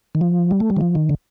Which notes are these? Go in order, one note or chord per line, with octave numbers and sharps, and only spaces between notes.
D#3
F3
G3
A3
G3
D#3
F3
D#3
D3